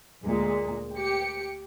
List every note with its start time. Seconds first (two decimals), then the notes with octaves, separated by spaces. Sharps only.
0.25 D2 A#2 G#3
0.96 G4 C#7